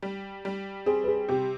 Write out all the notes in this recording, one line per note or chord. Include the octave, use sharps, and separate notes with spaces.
G3
G3
C4 G#4
B4
G#4
C3 G4